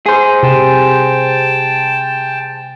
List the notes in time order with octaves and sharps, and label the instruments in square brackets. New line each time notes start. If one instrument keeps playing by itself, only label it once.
[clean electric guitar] G#4 C5
[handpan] C3 [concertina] G5 A5